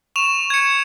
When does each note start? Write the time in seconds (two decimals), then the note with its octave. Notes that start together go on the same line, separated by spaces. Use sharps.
0.16 C#6 E7 F7
0.50 G#6 C#7